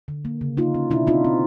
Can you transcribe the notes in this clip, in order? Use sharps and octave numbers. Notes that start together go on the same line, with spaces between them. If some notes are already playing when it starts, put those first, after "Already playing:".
D3
A#3
C#3
A#3 D#4 F4
C#4
B2 D4 E4
C4 D#4 F4
C4